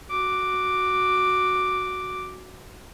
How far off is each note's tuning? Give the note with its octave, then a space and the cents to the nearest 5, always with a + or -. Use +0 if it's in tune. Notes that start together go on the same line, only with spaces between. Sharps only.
F#4 +0 D6 +0